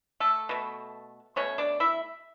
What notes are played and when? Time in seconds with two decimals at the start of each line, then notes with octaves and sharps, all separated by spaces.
0.20 A3 A4
0.49 B2 A3
1.36 B2 A3 C#4 C#5
1.58 D4 D5
1.80 E4 E5